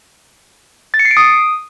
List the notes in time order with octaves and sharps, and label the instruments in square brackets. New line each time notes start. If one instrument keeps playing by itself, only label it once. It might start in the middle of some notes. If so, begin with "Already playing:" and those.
[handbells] A6
C#7
C7
D7
D#6